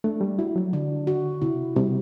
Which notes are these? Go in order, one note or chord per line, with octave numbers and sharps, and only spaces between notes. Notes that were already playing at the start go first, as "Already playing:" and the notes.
A3 D4
G3
E4 F#4
F#3
D3 D4
F#4
C3 E4
C3 G3